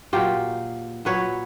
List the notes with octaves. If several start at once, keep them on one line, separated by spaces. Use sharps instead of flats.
A#2 F#3 F4 G4
A#2 F#3 B4 C#5